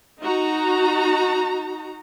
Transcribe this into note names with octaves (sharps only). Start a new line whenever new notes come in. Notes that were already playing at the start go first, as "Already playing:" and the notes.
D#4 F#4 A#5